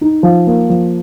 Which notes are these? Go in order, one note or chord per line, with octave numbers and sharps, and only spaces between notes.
D#4
F3
A#3
F3